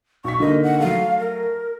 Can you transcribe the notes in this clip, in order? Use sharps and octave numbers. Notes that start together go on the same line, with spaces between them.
B1 C#6 B6
D3 A#3 D#4 D#5
F#5
F#3 A3 F5
A#4